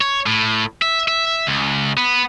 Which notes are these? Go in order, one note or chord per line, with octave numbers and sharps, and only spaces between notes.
C#5
A2
E5
E5
C#2
B3